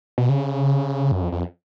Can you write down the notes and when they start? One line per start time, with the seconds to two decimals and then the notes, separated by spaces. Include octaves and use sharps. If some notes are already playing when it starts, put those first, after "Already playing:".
0.18 B2
0.29 C#3
1.11 F#2
1.22 F2
1.32 F2